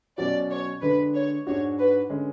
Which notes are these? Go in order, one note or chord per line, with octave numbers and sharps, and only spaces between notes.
B2 F#3 C#4 F#4 D5
C#5
D3 G#3 D4 B4
C#5
G#2 G#3 D4 F#4 C#5
B4
D3 G#3 C#4